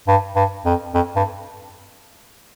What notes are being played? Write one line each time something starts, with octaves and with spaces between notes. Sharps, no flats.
G2
G2
F2
F2
G2